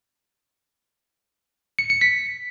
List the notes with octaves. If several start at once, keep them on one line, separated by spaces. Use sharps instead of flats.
C#7
C#7
B6